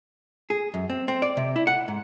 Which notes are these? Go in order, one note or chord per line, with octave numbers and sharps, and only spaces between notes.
G#4
F#2
C4
C4
D5
C3
E4
F#5
G#2